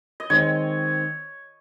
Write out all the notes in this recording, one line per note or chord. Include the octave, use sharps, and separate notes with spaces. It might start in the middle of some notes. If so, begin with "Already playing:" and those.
D#5
D#3 G#3 C4 C#5